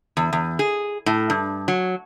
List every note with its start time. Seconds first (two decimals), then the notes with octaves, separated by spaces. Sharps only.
0.17 E2
0.33 E2
0.59 G#4
1.06 A2
1.30 G2
1.68 F#3